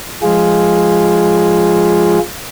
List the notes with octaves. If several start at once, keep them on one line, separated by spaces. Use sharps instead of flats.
F3 G#3 F4 G#4